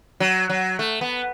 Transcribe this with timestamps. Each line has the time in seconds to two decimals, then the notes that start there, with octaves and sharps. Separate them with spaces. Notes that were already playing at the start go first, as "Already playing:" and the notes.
0.20 F#3
0.50 F#3
0.79 A3
1.01 B3